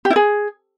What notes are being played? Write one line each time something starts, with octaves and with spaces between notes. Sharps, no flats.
G4
E4
G#4